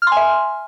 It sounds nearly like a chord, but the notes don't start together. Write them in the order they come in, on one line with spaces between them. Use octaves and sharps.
F6 C6 G#5 E5